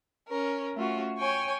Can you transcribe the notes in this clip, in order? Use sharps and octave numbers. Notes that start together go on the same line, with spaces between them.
C#4 A#4
A3 C#4 F4 F#4
C#5 G5 G#5 C#6